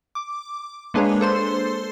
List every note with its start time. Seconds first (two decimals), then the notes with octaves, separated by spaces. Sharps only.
0.15 D6
0.94 G#3 A#3 D4 G#4 B4 C#5
1.21 A4 C5 C6